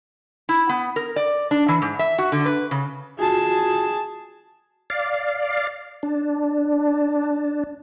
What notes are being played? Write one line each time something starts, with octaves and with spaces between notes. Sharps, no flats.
E4
B3
A#4
D5
D4
E3
G#2
E5
F#4
D3
B4
C#3
F4 F#4 G#4 A5
D5 F5
D4